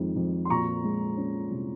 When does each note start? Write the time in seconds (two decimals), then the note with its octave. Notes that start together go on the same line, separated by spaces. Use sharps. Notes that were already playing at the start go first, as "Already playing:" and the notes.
Already playing: F2 D#3 G#3
0.16 F2
0.45 C6
0.50 A#2 A#5 C#6
0.84 G#3
1.17 C#4
1.50 C2